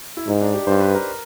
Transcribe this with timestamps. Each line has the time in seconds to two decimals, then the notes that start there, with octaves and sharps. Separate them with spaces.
0.17 E4
0.27 G#2 D#4
0.41 D4
0.54 G4
0.67 G2 C5
0.80 B4
0.95 A#4